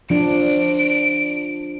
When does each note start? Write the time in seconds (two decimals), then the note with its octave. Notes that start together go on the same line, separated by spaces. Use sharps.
0.10 F3 D4 D7